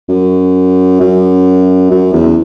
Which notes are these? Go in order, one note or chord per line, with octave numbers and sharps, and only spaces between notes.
F#2
F#2
F#2
E2